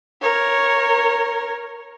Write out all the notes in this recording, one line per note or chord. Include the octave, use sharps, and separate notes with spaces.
A#4 C#5